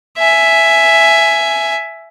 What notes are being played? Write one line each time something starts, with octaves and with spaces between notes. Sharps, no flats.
E5 G#5